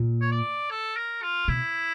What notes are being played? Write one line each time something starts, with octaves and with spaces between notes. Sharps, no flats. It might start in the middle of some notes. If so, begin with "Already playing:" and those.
Already playing: A#2
C#5
D5
A4
A#4
F4
B2 E4